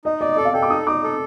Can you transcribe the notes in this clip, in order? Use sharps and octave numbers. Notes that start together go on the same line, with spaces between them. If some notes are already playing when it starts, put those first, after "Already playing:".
D#4 D#5
D5 D#5
A4 D#5
F5
A4 G5
D6
D#4 D#6
D#4 D6
A4